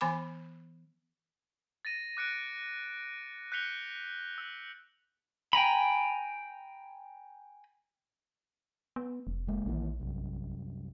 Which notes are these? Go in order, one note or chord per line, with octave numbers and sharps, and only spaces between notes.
E3 B3 G#5 B5 D6
A6 A#6 D#7
D6 F#6 C#7 D7
F#6 G6 B6 C#7 F7 G7
E6
G5 G#5 A#5 B5
B3
F1
C#2 G#3 A#3
A#1 D#3 E3 A#3
C2 F#2